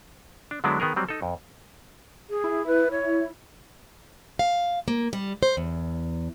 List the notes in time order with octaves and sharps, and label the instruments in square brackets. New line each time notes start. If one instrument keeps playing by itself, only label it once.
[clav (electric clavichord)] D4
D3 F#3 G#3 B3 D4 E4
D#3 B3 G#4 A#4
F#3 G3 C4
D#4 A4
F2
[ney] G#4
[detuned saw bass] E4
[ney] B4
C#5
[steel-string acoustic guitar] F5
A#3
G3
C5
E2